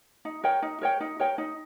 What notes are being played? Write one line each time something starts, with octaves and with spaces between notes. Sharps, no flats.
D#4
A#4 C#5 G5
D#4
A#4 C#5 G5
D#4
A#4 C#5 G5
D#4